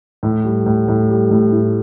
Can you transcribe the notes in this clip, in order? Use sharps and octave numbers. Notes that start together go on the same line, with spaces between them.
A2
G3
A2
A2
G3
A2
E4